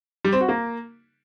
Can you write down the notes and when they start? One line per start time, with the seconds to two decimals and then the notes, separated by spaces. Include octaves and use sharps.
0.24 G3
0.32 C4
0.40 F#4
0.49 A#3